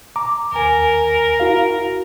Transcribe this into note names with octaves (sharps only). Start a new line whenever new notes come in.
A#5 D6
D#2 A#4 G#5
E4 F#4 F5